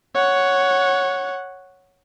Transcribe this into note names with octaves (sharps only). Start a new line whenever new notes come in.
C#5 F#5